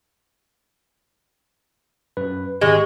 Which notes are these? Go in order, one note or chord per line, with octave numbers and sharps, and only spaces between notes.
F#2 B4
G#1 G#3 G4 C#6